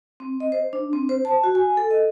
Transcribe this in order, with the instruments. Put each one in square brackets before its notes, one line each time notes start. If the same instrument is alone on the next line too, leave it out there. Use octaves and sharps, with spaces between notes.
[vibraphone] C4
D#5
C5
D4
C4
C5
A5
F#4
G#5
A4
D#5